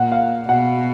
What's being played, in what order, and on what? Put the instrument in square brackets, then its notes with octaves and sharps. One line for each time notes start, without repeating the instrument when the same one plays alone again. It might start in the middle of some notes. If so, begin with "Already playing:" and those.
Already playing: [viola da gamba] A#2 [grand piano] F#5
[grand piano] F5
[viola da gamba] B2 [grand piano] F#5